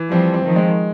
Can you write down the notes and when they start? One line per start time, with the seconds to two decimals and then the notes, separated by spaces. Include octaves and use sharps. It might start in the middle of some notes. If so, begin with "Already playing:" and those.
Already playing: E3
0.11 F3 G3 C4
0.34 C4
0.45 D#3 F3
0.56 G#3